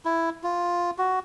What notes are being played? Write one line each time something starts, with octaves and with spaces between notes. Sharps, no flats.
E4
F4
F#4